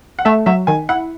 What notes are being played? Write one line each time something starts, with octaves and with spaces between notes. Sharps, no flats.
F#5
A3 E5
F#3 E5
D#3 G#5
E4 F#5